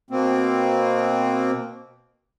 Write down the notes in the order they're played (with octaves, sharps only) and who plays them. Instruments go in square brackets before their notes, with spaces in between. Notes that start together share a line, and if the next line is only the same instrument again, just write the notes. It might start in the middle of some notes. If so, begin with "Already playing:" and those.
[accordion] B2 A#3 C4